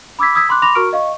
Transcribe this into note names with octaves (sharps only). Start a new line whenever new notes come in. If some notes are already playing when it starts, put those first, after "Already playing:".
B5 D6 E6 G#6 B6
D#6 E6 G#6 B6
B5 C6 D6 F#6
B5 C6 D6 A#6 F7
F#4 A#4 A#5 C#6 F6 D7
D#5 F5 C#6